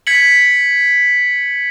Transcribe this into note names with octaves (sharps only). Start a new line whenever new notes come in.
G#6 B6 C#7 F#7